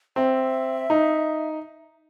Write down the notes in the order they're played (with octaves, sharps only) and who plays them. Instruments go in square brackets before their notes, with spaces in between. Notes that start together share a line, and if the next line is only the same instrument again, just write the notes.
[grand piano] C4 [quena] E5
[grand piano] D#4